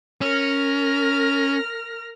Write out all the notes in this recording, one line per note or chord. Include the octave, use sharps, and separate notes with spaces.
C#4 A#4 F6 A#6